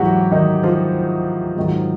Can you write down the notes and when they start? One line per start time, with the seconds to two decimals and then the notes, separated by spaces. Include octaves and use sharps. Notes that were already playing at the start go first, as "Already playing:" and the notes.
Already playing: G#2 E3 F#3 F#4 G4
0.32 D#3 D#4
0.63 F3 F4
1.57 G#2 D#3 F#3